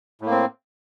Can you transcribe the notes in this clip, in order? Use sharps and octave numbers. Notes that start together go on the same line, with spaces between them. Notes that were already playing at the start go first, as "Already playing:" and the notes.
A2 A#3 C4